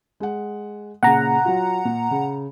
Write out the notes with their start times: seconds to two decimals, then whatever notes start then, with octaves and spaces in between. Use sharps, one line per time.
0.20 G#3 F#5
1.03 A#2 C#3 F#5 A#5
1.45 F#3 F4
1.85 A#2
2.11 C#3